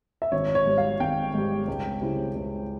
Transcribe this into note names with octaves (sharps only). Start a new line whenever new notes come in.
E5
G#1 C#5
C#5
G#2 G3
F5
G#1 G5
G#2 G3
C#2
C#3 G3 C4 E4
C#2